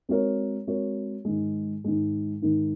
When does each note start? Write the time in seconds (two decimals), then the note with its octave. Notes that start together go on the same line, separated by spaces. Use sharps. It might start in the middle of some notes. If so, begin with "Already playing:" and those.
0.09 G#3 C4 F#4 A#4 C#5
0.67 G#3 C4 F#4 A#4 C#5
1.25 G#2 D#3 G#3
1.84 G#2 D#3 G#3
2.42 G#2 D#3 G#3